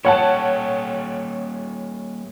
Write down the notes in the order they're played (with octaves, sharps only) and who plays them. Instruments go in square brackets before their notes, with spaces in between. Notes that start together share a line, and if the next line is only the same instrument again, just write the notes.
[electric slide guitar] G3 A#3 G4 [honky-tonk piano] C#5 F#5 A5